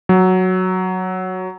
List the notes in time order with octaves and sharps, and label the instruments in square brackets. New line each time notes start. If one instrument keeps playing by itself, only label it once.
[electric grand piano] F#3